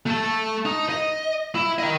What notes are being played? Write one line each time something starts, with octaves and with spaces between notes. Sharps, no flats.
A3 A5
D#4
D#5
E4
A#4 D#5